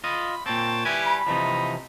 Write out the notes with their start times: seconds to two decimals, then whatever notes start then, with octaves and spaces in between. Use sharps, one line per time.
0.04 F4 D#5 B5
0.46 A#2 C4 C#5 G5 A5
0.85 G3 E4 G4 B4 G#5
1.06 B5
1.27 C3 E3 F3 D#4